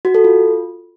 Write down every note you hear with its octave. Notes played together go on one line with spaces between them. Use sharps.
F#4
A4
F4